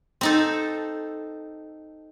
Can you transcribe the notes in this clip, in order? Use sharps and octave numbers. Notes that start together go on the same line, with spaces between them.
C4 D#4 A4